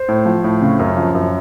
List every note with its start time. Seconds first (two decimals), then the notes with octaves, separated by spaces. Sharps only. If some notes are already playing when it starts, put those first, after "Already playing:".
Already playing: C5
0.09 A2
0.26 F3
0.44 A2
0.62 C#3
0.79 F#2
0.97 F3
1.15 F#2